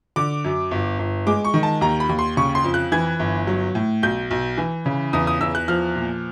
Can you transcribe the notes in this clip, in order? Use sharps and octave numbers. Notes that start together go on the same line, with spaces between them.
D3 D6
F#2
G1
G1
G#3 D6
C#6
D#3
A5
D#2 A#5
B5
D#2
C6
C#3 C#6
C6
F2
F#6
E3 G#6
G1
F#3
A2
B1 G6
B1
E3
C#3
E2 D#6
D#6
E2 E6
F#6
F3 F6
A#2